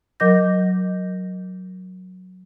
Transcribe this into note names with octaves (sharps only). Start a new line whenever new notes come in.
F#3 A#4 D#5 D6 G6 A#6